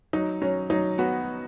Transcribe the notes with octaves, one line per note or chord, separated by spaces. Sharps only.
F#3 D#4
F#3 C#4
F#3 D#4
B3 F#4